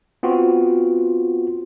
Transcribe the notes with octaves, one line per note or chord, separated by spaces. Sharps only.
B3 C4 F4 F#4